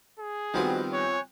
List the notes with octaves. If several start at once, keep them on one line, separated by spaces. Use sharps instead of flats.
G#4
D#3 F3 G3 B3 C4 F#4 C5 D#5
C#5 G#5 F#6 G6